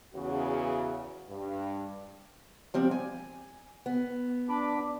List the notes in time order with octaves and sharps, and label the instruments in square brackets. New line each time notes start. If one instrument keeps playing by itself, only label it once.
[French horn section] E2 C#3 F#4
G2
[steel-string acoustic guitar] F3 G3 C4
G#5
B3
[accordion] D4 B5 D6